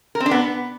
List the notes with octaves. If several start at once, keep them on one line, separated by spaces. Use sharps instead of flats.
A#4
C4
D4
B3